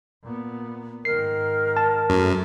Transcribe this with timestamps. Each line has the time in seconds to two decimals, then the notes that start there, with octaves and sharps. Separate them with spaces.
0.23 A#2 B3
1.05 G#2 D#3 A#4 C7
1.77 A5
2.10 F#2 F#3 A3